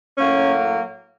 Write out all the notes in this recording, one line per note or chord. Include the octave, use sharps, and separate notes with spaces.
A2 F#3 A#3 C#4